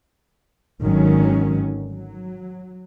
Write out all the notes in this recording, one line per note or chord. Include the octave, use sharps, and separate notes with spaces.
G#1 D3 D#3 F#3 C#4
F#3